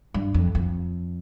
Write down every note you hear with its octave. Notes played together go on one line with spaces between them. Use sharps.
G2
F2
F2